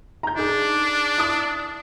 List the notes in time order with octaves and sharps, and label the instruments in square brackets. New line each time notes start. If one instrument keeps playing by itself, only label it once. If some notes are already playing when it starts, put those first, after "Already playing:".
[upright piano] A#5 G6
[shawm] D4 [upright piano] D#4 G#4
[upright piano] E4 A5 D#6